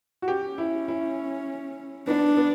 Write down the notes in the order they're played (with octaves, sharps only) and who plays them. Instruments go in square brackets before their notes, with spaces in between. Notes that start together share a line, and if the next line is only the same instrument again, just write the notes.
[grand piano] F#4
[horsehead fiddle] C#4 [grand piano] G4
[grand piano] E4
E4
[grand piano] B3 [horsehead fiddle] D4
[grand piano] B3